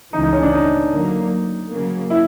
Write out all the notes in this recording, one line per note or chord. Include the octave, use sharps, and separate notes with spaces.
C#2 C#3 E3 D#4
D#4
C#4
D4
D#4
D3 F#3 A#3
C#3 F#3 A#3
E4